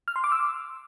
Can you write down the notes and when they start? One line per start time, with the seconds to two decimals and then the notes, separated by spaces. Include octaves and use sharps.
0.08 F6
0.16 C6
0.24 D6
0.32 E6